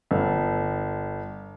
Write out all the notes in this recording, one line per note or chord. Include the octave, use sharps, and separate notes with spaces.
G1